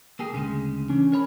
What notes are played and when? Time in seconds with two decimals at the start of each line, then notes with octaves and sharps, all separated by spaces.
0.19 A#3 G4 G#4
0.32 D2 C#3 G#3
0.89 E3 C#4 D4
1.12 A#4 C#5 B5